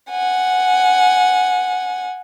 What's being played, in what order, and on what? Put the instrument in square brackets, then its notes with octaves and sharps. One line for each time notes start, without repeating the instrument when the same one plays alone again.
[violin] F#5 G#5